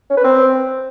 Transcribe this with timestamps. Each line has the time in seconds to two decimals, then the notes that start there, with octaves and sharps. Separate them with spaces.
0.10 C#4
0.17 B4
0.24 C4